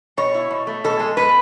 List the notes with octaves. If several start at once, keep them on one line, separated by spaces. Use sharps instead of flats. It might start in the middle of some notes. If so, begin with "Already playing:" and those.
B2 C#5
E4
B2
A3
B2 A4
G#3
B2 B4